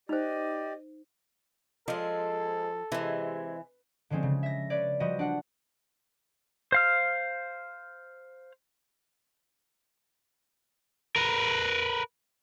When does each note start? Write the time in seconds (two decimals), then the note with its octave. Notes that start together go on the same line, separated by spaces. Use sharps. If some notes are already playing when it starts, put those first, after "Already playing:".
0.09 D#4 G4 C5 D5 D#5
1.88 F3 G#3 C4 A4
2.92 C3 E3 G#3
4.10 D3 F3 G#3 C4 C#4
4.23 C#3
4.43 E5 A#6
4.70 B4 C#5 D5
5.00 F3 G3 F#4 D#5
5.19 D4 F#5
6.72 C5 F5 F6
11.16 A#4 B4